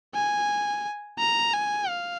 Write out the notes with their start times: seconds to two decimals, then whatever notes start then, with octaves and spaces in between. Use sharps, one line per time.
0.15 G#5
1.19 A#5
1.53 G#5
1.88 F5